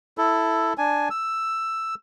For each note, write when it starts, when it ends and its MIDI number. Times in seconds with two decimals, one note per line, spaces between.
0.18 0.73 64
0.18 0.73 69
0.78 1.09 62
0.78 1.09 80
1.10 1.95 88